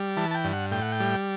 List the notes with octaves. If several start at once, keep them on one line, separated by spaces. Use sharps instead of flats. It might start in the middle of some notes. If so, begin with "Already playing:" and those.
Already playing: G3
E3 A5
A5
G5
G2
F#5
A2 G5
F#5
G5
G3